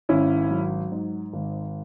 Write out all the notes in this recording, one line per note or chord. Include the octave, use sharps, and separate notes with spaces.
G#1 C#4 E4
F#3
G#2
G#1